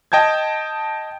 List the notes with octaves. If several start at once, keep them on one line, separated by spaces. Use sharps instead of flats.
D#5 G5 A5 G6 G#6